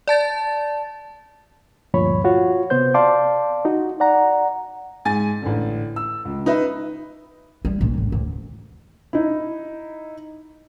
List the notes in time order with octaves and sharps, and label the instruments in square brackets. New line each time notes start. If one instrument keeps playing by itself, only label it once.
[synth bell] D5 A5 A6
[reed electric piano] D2 G2 A#2 F3 C#5 B5
F4 F#4 C#5
C3 B3 C5 G6
D5 F5 A5 C6 D6
D#4 F#4
D5 F#5 A#5
[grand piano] G#2 G#5 A6
A1 D3
E6
C#2
D#4 B4 E5
[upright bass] G3
A#1 E3
A2
D2
[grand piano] D#4 E4